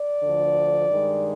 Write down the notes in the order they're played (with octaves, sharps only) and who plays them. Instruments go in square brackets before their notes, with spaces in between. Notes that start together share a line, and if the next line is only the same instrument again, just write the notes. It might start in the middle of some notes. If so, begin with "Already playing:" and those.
Already playing: [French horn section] D5
D2 D3 F3
G2 D#3 G#3